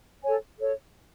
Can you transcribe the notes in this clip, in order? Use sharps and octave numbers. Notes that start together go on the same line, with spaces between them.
A4 C#5 G#5
A4 C#5